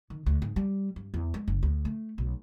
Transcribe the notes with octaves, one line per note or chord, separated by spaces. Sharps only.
D#3
D2
G#2
G3
G2
E2
G#3
F#1
D2
A3
B1